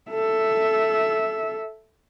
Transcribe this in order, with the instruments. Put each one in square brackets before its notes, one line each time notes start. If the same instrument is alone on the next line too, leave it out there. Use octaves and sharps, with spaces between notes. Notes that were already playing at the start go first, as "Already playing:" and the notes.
[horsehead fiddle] A4 E5